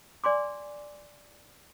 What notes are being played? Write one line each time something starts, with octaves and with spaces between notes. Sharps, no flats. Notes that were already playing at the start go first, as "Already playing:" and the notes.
D5 G#5 C6 D6